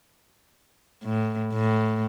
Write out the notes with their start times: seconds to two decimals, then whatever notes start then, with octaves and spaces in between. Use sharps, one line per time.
1.04 A2
1.53 A2